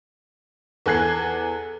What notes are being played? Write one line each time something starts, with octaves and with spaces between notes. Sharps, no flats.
E2 A4 G#5 F#6 G#6 C7